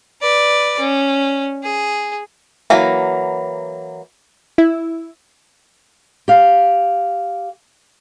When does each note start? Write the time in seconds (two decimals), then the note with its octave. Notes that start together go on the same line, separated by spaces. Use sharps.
0.21 B4 D5
0.79 C#4
1.63 G#4
2.70 E3 F#3 A#3
4.58 E4
6.28 G4 F5